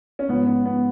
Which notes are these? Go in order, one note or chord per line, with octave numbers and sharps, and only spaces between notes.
C#4
G#2 F3 B3
B3
B3